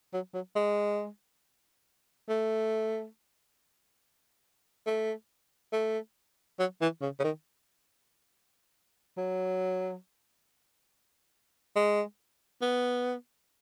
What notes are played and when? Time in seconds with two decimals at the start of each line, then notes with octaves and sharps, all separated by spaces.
0.13 F#3
0.34 F#3
0.56 G#3
2.29 A3
4.86 A3
5.72 A3
6.59 F#3
6.81 E3
7.02 C#3
7.20 C#3
7.24 D#3
9.17 F#3
11.76 G#3
12.62 B3